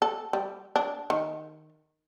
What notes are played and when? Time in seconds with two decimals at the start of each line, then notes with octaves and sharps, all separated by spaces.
0.02 A4
0.33 G3
0.76 D4
1.10 D#3